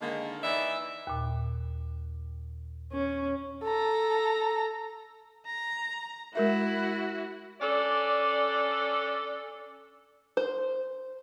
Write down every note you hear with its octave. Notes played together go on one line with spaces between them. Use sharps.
D3 D#3 G#3 A#3
E3 D#4 D5 E5
D#2 A#2
C#4
A4 A#5
A#5
G#3 E4 F#4 A#4 E5
C#4 D4 A4 D5
C5